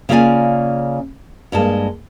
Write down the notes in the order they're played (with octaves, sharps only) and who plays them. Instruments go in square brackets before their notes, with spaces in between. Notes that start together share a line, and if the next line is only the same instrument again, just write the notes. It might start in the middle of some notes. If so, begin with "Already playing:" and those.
[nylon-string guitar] C#3 A#3 C#4 F4 D5 G#5
G2 G#3 A#3 A5